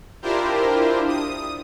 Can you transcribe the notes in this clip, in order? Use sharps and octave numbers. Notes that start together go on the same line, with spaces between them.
D4 E4 F4 G4 A#4 C5
D#6